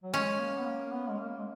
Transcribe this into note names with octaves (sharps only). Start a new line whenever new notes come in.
F#3
G#3 C#4
A#3
B3
A#3
B3
G#3
A#3
G#3